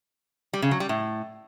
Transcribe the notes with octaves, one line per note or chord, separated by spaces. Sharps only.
G3
C#3
F#3
G3
A2